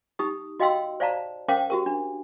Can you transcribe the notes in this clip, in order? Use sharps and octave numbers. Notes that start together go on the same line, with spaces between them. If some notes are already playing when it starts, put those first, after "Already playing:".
D#4 G4 D#6
F#4 D#5 F5 G5 C6 E6
C5 D5 F5 A5 A#5
C#4 A#4 C5 F5 G5 D6
F#4 G4 A#4
D4